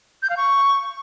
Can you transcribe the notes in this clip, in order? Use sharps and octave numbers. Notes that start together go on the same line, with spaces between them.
G6
F5
C#6